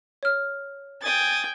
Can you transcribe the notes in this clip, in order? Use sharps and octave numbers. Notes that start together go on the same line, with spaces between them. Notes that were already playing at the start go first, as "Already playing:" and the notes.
C#5 F6
G5 G#5 D#6 A6